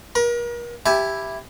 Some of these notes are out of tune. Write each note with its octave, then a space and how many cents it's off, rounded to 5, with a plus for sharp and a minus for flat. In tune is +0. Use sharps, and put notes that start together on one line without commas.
A#4 +40 A#5 +35
E4 +0 G4 +0 A5 -45